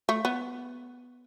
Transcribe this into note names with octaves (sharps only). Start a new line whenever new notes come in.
A3
B3